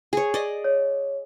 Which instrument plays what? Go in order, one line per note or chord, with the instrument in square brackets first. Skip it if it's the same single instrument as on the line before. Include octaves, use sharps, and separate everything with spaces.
[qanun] G#4 C#5
D5 D#5
[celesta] C#5